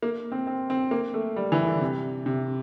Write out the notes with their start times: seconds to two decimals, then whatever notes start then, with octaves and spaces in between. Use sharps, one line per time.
0.03 A#3
0.32 C4
0.47 C4
0.70 C4
0.91 A#3
1.14 A3
1.36 G3
1.52 E3
1.66 D3
1.81 C3
2.26 C3